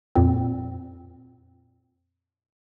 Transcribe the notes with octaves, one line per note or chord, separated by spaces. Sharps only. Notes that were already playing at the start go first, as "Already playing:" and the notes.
F2 A#2 C4